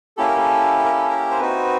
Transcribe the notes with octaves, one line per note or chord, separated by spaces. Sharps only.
A#3 C#4 E4 G4 A4
A#4
A4
A4
A#4
A4
A#4
C5
C4 D#4 F#4 B4